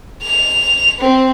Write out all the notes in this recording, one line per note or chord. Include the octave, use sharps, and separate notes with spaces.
F7
C4